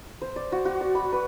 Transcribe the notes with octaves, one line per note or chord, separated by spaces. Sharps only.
C5
D5
F#4
F#4
D5
B5
B4